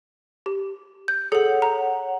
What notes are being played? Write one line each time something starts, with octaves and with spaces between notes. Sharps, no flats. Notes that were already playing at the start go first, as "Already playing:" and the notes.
G4
G6
G#4 A4 C#5 F#5
A#5